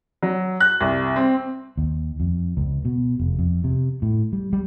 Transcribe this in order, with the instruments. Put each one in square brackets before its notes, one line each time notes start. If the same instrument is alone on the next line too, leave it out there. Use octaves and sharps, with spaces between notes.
[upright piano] F#3
F#6
C2
C4
[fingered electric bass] D#2
F2
C#2
B2
F1
F2
C3
A2
G3
G3